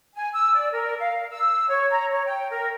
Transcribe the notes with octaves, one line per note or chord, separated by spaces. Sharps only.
G#5
E6
D5
A#4
F5
E6
C#5
A#5
C#5
G5
A#4